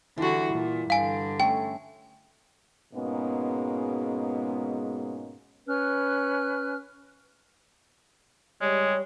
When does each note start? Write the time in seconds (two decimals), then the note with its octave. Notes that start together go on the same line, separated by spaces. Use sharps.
0.18 D3 E3 G3 F#4
0.54 A#2
0.90 G2 D3 F5 G#5
1.40 A3 C#4 G5
2.93 G#2 B2 G#3 A#3 B3 C#4
5.67 C#4 B4 F6 F#6
8.61 G3 G#3 C#5